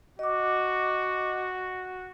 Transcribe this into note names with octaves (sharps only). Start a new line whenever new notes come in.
F#4 D#5 D6